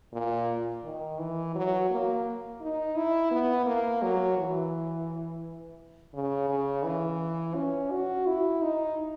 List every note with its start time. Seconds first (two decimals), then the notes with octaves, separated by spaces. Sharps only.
0.13 A#2
0.84 D#3
1.19 E3
1.55 F#3
1.90 A#3
2.61 D#4
2.96 E4
3.31 B3
3.66 A#3
4.02 F#3
4.38 E3
6.14 C#3
6.49 C#3
6.85 E3
7.55 C#4
7.91 F#4
8.27 E4
8.62 D#4